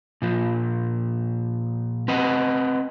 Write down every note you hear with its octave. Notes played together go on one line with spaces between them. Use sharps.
A#2 F3
C4 B4 D#5 F#5